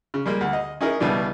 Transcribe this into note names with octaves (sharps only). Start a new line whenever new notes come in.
C#3
G3 G#3 A#3
D2
D#5
C#4 D#4 E4 G#4 A#4
C#2 B2 E3 G3 D4